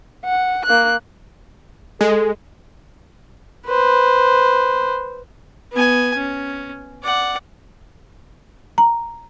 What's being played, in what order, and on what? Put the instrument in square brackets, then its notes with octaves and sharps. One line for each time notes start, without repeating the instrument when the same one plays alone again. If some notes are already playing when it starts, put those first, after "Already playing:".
[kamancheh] F#5
A#3 F#6
[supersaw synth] G#3 [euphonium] A4
[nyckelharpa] B4 C5
B3 G#5
C#4
D5 F#5
[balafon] A#5